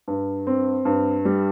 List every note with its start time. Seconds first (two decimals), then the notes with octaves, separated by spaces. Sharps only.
0.08 G2
0.47 C4
0.85 G2
1.25 G3